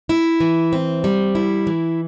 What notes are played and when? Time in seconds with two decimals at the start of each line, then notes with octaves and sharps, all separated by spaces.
0.09 E4
0.40 E3
0.73 C4
1.04 G3
1.35 E4
1.67 E3